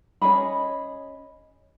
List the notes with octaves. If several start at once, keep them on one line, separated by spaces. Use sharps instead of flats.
C#4 G#4 D#5 B5